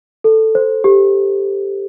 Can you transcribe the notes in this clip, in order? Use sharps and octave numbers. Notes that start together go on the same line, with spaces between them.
A4
C5
G4